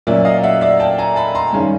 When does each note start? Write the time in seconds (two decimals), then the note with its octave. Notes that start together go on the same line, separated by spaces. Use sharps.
0.07 A#2 F#3 A#3 C#4 D5 E5
0.25 D#5 F5
0.43 E5 F#5
0.61 D5 E5
0.80 G5 A5
0.98 G#5 A#5
1.16 A5 B5
1.35 A#5 C6
1.53 G2 D#3 G#3 C#4